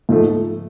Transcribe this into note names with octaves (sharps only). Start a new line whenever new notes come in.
G#2 F3 A3